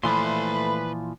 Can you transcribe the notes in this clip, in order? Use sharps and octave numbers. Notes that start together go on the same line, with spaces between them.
A#2 E3 F3 A3 B4 B5 C6